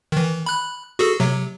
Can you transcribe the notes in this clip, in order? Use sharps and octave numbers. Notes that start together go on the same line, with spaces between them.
D#3 E3
B5 F#6
F#4 G#4 A4
C3 F#3